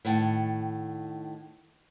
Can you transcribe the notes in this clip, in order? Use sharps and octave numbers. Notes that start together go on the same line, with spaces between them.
A2 D#3 F#5 G5 A5